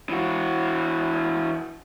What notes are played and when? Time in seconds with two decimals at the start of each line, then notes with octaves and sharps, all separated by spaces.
0.10 E3 F#4